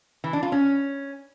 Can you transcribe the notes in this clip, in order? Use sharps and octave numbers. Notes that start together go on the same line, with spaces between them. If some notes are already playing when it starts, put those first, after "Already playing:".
E3
D4
F4
C#4